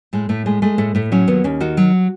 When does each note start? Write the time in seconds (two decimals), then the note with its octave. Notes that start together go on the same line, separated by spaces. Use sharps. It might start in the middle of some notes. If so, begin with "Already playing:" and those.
0.13 A2 G#3
0.29 A2 A3
0.46 G#3 A3
0.62 G#3 A3
0.78 A2 A3
0.95 A2 A3
1.12 F#3 C#4
1.28 D#2 B3
1.44 D#2 C#4
1.60 D#3 F#4
1.77 F#3